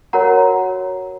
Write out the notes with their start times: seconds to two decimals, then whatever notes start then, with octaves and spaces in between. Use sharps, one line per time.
0.13 F#4 A#4 C#5 F#5 A#5